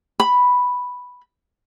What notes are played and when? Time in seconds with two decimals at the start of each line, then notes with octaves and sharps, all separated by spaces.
0.20 B5